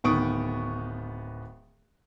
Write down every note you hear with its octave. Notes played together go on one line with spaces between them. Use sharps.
D1 D#3 B3 C#6 D#6 D7